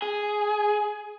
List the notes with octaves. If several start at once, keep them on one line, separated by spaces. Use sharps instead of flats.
G#4